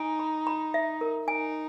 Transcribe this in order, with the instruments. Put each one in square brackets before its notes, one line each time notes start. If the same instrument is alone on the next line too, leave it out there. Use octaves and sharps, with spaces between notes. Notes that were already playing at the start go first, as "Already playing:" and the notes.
Already playing: [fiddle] D#4 [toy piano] G#5
[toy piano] B5
B5
E5
A#4
[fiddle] D#4 [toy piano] G#5